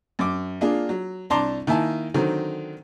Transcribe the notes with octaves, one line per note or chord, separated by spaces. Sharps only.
F#2 D6
A#3 D4 F4 G#4
F#3
C2 D4 A5 A#5 C6 D6
D#3 A#3 E4 G#5 A5
D3 D#3 F#3 C4